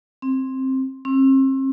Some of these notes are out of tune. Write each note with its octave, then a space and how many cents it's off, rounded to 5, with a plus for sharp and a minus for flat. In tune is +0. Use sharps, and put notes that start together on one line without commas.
C4 +10
C4 +40